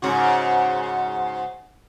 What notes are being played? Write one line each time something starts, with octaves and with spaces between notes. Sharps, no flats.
G#2 C#3 F#4